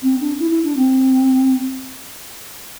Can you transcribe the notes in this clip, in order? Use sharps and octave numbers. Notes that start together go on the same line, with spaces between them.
C4
D4
E4
E4
D4
C4